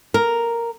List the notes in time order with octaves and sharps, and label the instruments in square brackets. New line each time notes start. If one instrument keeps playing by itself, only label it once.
[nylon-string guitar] A#4